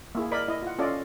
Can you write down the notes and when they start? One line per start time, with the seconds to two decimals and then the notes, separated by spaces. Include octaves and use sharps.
0.15 A#3 E4 G#4
0.31 A#4 D5 D#5 B5
0.48 E4 D#5
0.63 F4 F#5
0.79 C#4 F4 A4 D5 D#5